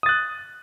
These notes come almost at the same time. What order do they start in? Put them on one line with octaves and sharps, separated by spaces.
D#6 A6 F#6